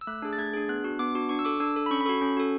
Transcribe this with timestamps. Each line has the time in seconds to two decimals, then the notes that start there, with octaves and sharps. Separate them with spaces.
0.01 E6
0.07 A3 F#6
0.22 D4 G#4
0.33 A6
0.38 A3 G#6
0.54 D4 G#4
0.69 B3 F#6
0.84 D4 F#4
0.99 B3 D6
1.15 D4 F#4
1.29 D4 C#6
1.39 E6
1.45 A4 D6
1.60 D4 E6
1.76 A4
1.86 B5
1.91 C#4 C#6
2.01 B5
2.06 F#4 A4 C#6
2.21 C#4
2.37 F#4 A4